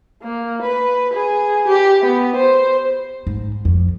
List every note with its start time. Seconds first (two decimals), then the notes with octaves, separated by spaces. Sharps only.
0.23 A#3
0.62 B4
1.14 G#4
1.68 G4
2.02 B3
2.36 C5
3.27 G#2
3.65 F2